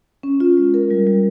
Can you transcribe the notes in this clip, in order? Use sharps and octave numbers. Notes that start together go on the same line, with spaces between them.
C#4
F4
G#3
A#4
G3
G3